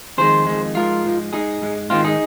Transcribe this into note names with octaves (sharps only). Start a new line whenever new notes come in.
F2 D#3 G#3 G#4 C5
F2 D#3 G#3
G#2 F3 G#3 F4 A#4
G#2 F3 G#3
G#2 G#3 D#4 G#4
G#2 G#3
G#2 D#3 G#3 C4 F4
D#4 G#4